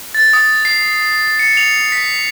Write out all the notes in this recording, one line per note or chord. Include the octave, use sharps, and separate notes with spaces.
A6
D#6
C7
C#7
F7
B6